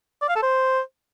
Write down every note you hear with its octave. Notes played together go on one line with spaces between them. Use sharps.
D5
F5
A4
C5